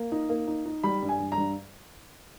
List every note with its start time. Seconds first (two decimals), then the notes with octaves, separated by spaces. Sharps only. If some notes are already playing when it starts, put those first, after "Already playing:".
Already playing: A#3
0.12 D#4
0.30 A#3
0.48 D#4
0.66 D#4
0.84 G3 B5
1.03 G2
1.09 G#5
1.20 G2
1.32 A#5
1.38 G2